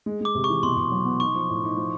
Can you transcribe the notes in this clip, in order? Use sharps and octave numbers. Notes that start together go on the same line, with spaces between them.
G#3
G#3 D6
C3
C#6
E3
B2 C6
B2
F#3
B3
D#4 C#6
F3
A2
D#4
F3